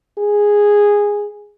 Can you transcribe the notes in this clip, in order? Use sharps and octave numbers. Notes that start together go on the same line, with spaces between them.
G#4